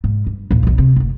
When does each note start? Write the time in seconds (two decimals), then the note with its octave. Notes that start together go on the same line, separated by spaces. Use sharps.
0.04 G#2
0.26 G2
0.51 D#2 A#2
0.63 B1 F2
0.78 C3 C4
0.96 F#1 D2